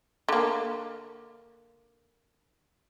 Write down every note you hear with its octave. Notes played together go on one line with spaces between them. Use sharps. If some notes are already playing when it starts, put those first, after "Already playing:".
D3 A#3